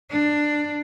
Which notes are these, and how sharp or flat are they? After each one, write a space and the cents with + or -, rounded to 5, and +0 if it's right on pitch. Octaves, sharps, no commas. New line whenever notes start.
D4 +10